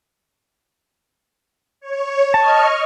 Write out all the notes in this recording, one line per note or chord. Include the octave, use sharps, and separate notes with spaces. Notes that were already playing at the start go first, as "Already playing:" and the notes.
C#5
D#5 A5 C#6 F6